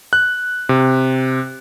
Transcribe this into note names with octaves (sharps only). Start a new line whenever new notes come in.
F#6
C3